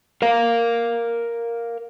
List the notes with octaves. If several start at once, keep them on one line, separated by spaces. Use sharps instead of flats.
A#4 F5